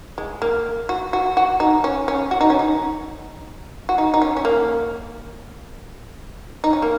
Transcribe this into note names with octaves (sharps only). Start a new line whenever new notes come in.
G#3
A#3
F#4
F#4
F#4
D#4
C#4
C#4
F#4
D#4
C#4
D#4
F#4
D#4
D#4
C#4
C#4
A#3
D#4
C#4
A#3